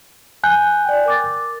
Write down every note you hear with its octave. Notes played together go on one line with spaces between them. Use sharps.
G#5 F#6 G6
D5 G5
A#4 D6 A6